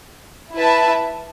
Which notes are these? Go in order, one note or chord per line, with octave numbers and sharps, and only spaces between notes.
E4 B4 E5 A5